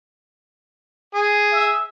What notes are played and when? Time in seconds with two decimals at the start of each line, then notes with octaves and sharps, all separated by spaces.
1.15 G#4
1.52 E5